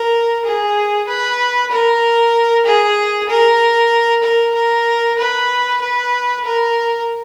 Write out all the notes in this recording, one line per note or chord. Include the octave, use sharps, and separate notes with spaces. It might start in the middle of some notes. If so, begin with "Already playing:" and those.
Already playing: A#4
G#4
B4
A#4
G#4
A#4
A#4
A#4
B4
B4
A#4